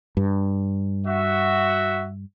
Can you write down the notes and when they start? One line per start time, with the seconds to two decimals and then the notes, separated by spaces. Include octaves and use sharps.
0.17 G2
1.07 F#4 E5